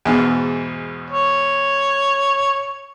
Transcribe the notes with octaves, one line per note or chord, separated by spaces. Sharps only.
E2 G#2 B2
C#5